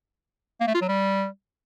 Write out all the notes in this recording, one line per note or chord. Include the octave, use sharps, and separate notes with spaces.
A#3
A3
F4
F#3
G3